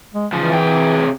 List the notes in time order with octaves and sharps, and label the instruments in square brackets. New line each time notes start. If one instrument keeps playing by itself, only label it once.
[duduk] G#3
[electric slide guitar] C#3 F3 [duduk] E3
[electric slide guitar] C3 G#4 G5